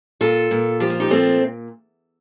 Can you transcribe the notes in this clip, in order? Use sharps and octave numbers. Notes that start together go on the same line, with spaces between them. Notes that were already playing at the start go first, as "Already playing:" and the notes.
A#2 F4 A4
A#2
F3 G4
F4
D#4 G4
A#2 A3 C4